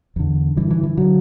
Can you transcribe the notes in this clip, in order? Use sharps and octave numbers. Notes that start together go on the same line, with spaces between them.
E2 D3
G2 D3 E3
E3
E3
D3 F#3